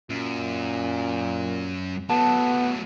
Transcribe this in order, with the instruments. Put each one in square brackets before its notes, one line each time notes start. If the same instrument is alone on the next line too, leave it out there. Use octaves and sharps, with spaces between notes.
[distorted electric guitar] F#2 [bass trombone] A#2
[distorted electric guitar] F#3 A3 [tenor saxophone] B3 [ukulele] A5